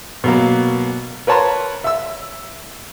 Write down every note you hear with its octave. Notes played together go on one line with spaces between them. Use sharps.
B2 F#3 A#3
A#4 B4 C#5 A5 A#5 C6
E5 E6